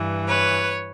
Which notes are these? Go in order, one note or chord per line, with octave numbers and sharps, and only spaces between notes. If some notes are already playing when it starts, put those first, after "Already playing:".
Already playing: G2 E3
B4 C#5